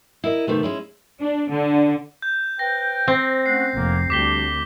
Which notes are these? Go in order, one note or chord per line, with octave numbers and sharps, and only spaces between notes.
E4 A#4 D#5
C3 D#3 A3 B3
G#3 C#4 E4
D4
D3
G6
B4 C5 G5 A#6
C4
A3 C#4 F#5 C7
F1 A#3
D2 G3 D4 G4 D6 B6 G7